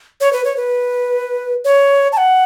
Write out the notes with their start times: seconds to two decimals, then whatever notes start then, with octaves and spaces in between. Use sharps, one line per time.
0.21 C#5
0.33 B4
0.45 C#5
0.57 B4
1.65 C#5
2.13 A5
2.17 F#5